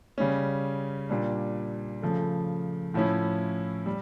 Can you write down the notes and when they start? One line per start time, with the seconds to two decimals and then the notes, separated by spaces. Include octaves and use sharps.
0.18 C#3 G3 C#4
1.09 A#2 G3 D4
2.02 C#3 F3 A3
2.94 A2 F3 C#4 E4
3.86 G3